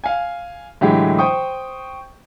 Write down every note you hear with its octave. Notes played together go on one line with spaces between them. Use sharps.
F5 G#5
A2 D3 E3 F#3 G#3 G4
C5 G5 C#6 D#6